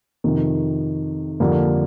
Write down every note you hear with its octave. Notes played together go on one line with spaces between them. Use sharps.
F2 C3 D#3
F2 D3 G3 A#3